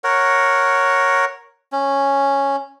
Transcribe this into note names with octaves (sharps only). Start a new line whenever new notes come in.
A#4 C#5 F#5
C#4